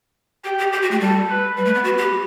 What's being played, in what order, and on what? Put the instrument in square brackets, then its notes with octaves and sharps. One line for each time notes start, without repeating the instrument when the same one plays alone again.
[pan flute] G4 [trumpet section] G5
[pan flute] G4
[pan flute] G4 [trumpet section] G5
[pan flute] F#4
A3
[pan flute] G3 [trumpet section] A4
[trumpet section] B4
[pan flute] G3 [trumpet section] B4
[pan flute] A3
B3
[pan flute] F#4 [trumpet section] B4
[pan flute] G4